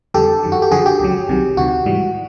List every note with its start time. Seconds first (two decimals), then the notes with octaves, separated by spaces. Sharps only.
0.14 F2 D3 G3 G4 A4
0.43 F#2 D#3 F#3
0.52 F#4
0.62 G4
0.71 F#2 D3 F3 F#4 G#4
0.86 G4
1.00 C#2 C#3 F#3
1.29 C2 C3 D#3 F#3
1.57 D2 C3 D#3 F#4
1.86 G#2 E3 G3